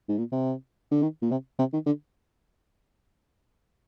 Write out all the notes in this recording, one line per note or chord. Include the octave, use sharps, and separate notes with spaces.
G#2
A#2
C3
D3
D#3
A#2
C3
C3
D#3
D3